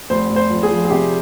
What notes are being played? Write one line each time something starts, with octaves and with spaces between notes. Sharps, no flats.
F1 C5
F1
C5
F2
G#4
F3
G#4
C3 G4